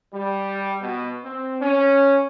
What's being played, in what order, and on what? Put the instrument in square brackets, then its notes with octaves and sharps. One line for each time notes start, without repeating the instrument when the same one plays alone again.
[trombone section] G3
B2
C4
C#4